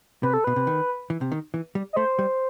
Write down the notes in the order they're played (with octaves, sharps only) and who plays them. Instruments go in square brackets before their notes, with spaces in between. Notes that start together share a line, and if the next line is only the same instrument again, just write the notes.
[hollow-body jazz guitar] C3 [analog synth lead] B4
[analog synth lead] A4
[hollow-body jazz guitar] B2 [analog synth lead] B4
[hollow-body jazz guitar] C3
D#3
E3
C3
D#3
E3
G3
[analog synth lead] D#5
[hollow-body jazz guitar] A3 [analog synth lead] C5
[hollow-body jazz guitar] G3